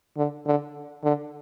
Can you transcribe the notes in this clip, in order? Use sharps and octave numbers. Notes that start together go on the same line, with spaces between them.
D3
D3
D3